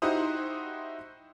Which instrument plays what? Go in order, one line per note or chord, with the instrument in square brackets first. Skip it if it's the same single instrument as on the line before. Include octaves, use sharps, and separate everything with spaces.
[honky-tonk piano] D#4 E4 F#4 G4 C5 D#6